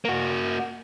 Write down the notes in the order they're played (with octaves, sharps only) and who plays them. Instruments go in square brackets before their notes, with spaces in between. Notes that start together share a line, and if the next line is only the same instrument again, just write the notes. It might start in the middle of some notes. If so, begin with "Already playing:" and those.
[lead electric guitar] A#3 F#4